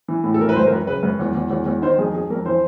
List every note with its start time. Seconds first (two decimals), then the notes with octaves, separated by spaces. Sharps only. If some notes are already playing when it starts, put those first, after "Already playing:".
0.08 E3
0.24 A2
0.34 A4
0.39 E3 A#4
0.49 B4
0.56 F#2 C5
0.66 A#4
0.71 F#2 B4
0.87 C#3 B4
1.03 F#2 B4
1.19 E2
1.35 E2
1.51 E2
1.66 E2
1.82 D#3 C5
1.98 F2 G#4
2.14 F2 G#4
2.30 F2 A#4
2.46 E3 C5